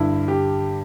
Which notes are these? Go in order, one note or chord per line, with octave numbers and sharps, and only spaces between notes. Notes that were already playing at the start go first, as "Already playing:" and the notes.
Already playing: G2 D3 E4
G4